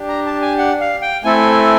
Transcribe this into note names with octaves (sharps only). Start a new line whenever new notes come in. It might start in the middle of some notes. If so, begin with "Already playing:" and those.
Already playing: D4 G4
A#5
A5
G#5
F#5
F5
G5
A3 C4 E4 A4 G#5